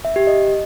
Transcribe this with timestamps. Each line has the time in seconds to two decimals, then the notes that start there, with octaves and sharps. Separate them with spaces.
0.05 E5
0.16 G4
0.27 D#5